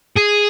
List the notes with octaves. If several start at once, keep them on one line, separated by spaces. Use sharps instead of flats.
G#4